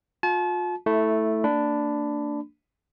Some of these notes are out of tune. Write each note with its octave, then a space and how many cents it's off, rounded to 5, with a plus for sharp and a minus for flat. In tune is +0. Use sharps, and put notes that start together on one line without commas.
F4 +35 A5 -40
A3 +0 E4 -15
A#3 -45 D4 +0 B5 +20